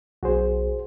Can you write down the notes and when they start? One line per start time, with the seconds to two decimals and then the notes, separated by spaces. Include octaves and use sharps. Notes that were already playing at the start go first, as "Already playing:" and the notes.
0.23 B1 F#4 G#4 C5